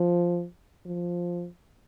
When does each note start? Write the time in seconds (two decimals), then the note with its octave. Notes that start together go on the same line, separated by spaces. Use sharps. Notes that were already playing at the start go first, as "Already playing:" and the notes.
Already playing: F3
0.86 F3